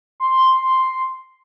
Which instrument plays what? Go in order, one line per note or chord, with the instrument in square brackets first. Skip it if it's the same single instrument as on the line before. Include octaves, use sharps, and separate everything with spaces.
[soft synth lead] C6